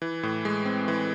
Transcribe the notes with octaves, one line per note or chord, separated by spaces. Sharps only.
E3
A2
G#3
C4
E3